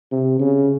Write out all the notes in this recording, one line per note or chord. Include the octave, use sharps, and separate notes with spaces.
C3
C#3